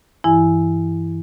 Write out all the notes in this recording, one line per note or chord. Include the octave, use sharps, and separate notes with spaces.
G2 E3 E4 G#5